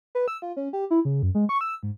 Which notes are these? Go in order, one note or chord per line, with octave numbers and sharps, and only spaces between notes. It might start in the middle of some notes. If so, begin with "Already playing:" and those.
B4
E6
F4
C#4
G4
E4
C#3
F#2
G#3
C#6
E6
G#2